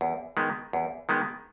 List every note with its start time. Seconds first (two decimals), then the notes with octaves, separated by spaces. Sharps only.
0.01 E2
0.37 D#3 G#3 B3
0.73 E2
1.09 D#3 G#3 B3